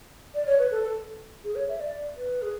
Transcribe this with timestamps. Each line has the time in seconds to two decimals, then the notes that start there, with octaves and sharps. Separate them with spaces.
0.34 D5
0.46 C#5
0.59 B4
0.71 A4
0.84 A4
1.44 G#4
1.55 C#5
1.69 E5
1.80 D5
2.17 B4
2.42 G#4